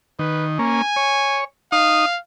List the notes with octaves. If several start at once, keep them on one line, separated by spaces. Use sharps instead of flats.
D#3 B4
A#3 C#4 G#5
C#5
D#4 F5 D#6